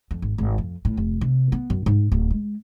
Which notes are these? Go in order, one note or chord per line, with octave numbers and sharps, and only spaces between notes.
F2
G#1
G#1
F2
A2
F1
C3
B3
F#2
G#2
D1
G#3